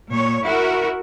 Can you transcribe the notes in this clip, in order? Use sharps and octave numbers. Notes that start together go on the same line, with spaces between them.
A#2 C#5
E4 F#4 A#4